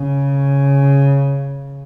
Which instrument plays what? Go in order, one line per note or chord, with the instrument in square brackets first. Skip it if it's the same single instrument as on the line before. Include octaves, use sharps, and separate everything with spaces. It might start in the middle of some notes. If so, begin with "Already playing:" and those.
Already playing: [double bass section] C#3